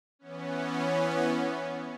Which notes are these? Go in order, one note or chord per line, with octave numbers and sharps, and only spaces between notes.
E3 B3 C#4